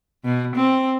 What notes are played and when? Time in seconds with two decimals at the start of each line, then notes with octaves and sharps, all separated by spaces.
0.25 B2
0.56 C4